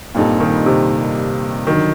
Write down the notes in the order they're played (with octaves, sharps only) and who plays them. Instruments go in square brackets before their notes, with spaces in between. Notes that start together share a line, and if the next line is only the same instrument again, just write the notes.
[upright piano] G2 [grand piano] A#2 G3 C4 D#4 A4
[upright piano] D#3
C3
[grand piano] D3 F#3 [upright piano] D#3